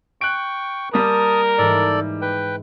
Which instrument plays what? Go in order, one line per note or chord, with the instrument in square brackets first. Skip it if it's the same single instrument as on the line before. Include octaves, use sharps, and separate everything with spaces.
[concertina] G5 C#6 [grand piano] F#6 D7
[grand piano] G3 A#3 [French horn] A#4 [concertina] A5 D#6
[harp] G#2 E3 [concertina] A4 D5
[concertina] B4 G5